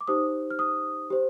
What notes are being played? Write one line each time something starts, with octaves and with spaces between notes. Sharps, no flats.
D6
D#4 G4 C5 D#6
F6
D#6
G4 C5